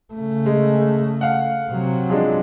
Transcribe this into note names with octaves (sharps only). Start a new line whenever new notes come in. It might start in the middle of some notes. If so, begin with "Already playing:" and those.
C#3 A3
G#3
F5 F#5
C3 F#3
F3 G#3 D4